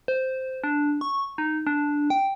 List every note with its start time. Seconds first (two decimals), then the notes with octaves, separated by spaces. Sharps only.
0.08 C5
0.64 D4
1.01 C#6
1.38 D#4
1.67 D4
2.10 G5